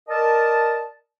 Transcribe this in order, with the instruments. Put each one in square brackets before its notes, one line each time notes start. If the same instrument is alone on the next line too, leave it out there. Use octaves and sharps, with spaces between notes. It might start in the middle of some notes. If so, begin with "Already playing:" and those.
[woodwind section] A#4 D5 D#5 A5